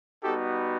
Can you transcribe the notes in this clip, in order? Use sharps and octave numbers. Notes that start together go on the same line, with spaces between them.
G3 B3 D#4 F#4 G4 A4